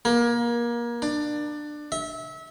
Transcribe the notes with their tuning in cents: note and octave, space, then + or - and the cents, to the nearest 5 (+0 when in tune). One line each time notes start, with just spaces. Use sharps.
A#3 +25
D4 +20
E5 -25